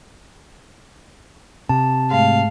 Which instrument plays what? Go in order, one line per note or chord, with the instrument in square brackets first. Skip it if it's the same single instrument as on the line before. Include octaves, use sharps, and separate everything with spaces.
[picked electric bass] C3 [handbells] A5
[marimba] G#2 G#3 A3 [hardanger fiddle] F5